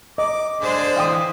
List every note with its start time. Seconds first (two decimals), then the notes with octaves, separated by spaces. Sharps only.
0.18 D#5 D6
0.60 D3 G#3 G#4 C5 D5
0.96 E3 F5 G5 D#6